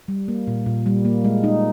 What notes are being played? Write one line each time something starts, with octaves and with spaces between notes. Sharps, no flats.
G3
A#3
A#2
A#2
G3
A#3
G#3
D#4